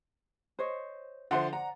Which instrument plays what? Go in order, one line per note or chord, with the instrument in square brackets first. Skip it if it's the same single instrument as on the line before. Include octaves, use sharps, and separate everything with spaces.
[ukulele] C5 C#5 D#5
[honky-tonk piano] D3 F3 C6 [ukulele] C5 E5 F#5
[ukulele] D5 F#5 [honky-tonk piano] A#5